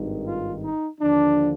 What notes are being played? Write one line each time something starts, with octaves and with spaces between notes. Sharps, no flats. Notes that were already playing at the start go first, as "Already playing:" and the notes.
Already playing: G#1 G2 D#3
F4
D#4
D#2 D3 F3 D4